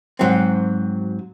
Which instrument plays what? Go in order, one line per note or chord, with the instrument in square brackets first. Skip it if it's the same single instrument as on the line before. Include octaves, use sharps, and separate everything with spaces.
[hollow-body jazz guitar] G#2 F#3 C4